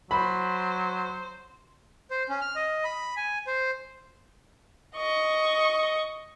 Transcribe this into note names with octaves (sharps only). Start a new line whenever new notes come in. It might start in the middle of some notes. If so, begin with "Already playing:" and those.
F#3 C5 B5
C5
C#4
F6
D#5
B5
G#5
C5
D#5 C#6